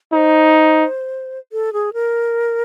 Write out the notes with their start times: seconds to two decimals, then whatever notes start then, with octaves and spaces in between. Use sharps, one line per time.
0.13 D#4 C5
1.53 A4
1.73 G#4
1.93 A#4